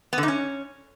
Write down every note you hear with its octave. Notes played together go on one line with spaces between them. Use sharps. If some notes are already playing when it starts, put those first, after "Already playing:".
B3
D3
D#4
C#4